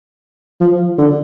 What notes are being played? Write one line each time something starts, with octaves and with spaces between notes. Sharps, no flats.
F3
D3